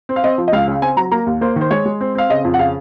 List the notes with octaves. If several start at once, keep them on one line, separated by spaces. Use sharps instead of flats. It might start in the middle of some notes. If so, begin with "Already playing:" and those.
C4
F5
C4 D#5
F3
D#5
C#2 F5
C#3
C4 G#5
F#3 A#5
A#3 A#5
D#2
A#3 C5
D#3
C5
G#3 C#5
G#3
C4
C4 F5
C#3 D#5
F2
F#5
C#3 F5